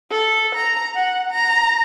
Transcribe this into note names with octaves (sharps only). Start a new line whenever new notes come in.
A4
A#5
F#5
A#5